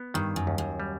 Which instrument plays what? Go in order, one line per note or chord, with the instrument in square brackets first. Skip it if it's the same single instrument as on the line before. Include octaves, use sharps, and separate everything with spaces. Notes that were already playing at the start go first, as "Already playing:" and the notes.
Already playing: [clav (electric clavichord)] B3
[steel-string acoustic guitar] G2 [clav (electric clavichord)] D#3
[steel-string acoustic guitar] F#2
[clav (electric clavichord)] D#2
[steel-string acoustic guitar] F#2
[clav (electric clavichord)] G3